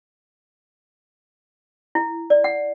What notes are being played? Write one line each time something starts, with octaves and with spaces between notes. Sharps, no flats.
E4
D5
F#5